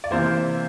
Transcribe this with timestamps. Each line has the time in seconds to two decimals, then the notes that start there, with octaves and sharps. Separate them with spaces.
0.04 D5
0.11 C3 E3 A#3 C5